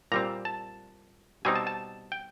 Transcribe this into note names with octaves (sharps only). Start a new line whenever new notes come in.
A#2 G3 C4 A#5
A5
B2 G3 C4 D#4 G#5
A5
A5
G5